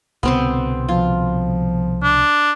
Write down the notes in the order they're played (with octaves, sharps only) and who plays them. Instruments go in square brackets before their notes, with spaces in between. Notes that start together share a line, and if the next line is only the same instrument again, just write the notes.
[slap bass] C2 B2 D3 [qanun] B3 C4 C5
[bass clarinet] F3 [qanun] F4
[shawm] D4